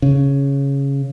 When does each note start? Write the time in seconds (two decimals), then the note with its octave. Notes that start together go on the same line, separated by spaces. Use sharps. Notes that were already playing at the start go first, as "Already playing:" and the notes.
0.02 C#3